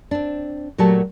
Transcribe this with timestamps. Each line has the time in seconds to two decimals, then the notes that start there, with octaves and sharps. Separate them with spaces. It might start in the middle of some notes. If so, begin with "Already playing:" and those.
0.11 C4 D4
0.78 A#2 F#3 A3 F#4 G4 A5